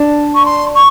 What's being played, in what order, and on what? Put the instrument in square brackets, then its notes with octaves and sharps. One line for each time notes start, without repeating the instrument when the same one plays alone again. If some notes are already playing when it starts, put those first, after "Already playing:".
Already playing: [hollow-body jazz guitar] D4
[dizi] C#6
C6
C#6